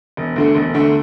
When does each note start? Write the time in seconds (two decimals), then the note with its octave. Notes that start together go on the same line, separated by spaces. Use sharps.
0.17 E1
0.36 D2 D3 A3
0.55 E1
0.74 D2 D3 A3